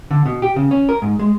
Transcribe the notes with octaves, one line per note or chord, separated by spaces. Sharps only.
D3
B2
G4
C#3
C#4
A#4
G#2
G#3